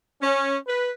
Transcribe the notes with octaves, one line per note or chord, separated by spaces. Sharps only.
C#4
B4